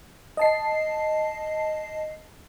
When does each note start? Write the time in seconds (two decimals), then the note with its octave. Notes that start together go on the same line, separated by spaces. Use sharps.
0.37 D#5 A5 C7